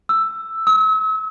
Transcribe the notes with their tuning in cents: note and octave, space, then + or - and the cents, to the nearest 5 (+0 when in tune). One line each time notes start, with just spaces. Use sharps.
E6 +5
E6 -40